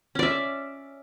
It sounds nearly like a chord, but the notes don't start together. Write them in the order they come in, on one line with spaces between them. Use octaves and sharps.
C#4 D5 E5